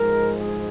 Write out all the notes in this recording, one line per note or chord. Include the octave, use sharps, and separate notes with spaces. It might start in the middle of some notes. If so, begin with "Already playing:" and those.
Already playing: G#2 F3 G#3 A#4
G#4